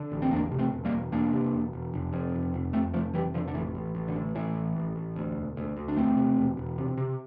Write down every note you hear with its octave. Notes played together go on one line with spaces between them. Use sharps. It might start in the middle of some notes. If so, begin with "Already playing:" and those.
Already playing: D3
A1
C4
E2 A#3 D4
C3
A3 C4
E1
G3 A#3
E1
E1 A#3 D4
C3
E1
E1
F1
F2
F1
F1
F2 A3 C4
F1 F3 A3
F1 E3 G3
F1 D3 F3
D3
A1 E3
A1
A1
D3
A2
A2 E3
A1
A1
A1
D2
E1
D2
D2
D4
E1 A3 C4
C3
E1
E1
C3
C3